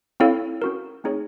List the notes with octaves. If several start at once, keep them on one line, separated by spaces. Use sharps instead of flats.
C4 E4 A4 C#5 F5
C#4 F#4 A#4
A3 C4 D#4 G#4 C#5